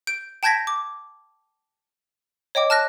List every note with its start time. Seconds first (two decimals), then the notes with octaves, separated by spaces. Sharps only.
0.07 G6 D7
0.43 G5 A5 G6 G#6 A#6 B6
0.67 D6
2.55 C#5 D#5 G5 D6
2.70 A5 F6 F#6 A#6